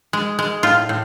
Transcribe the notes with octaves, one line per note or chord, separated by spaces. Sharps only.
G#3
G#3
A2 F4
A2